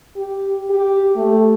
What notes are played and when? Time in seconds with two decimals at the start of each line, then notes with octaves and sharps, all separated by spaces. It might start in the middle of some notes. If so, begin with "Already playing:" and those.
0.16 G4
0.70 G4
1.16 A3